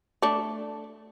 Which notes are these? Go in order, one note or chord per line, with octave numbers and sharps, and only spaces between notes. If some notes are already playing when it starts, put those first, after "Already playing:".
A3 D4